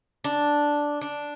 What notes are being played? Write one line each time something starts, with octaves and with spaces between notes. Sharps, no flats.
D4
D4